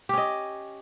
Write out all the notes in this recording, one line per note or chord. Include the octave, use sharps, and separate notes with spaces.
C#4 G4 D#5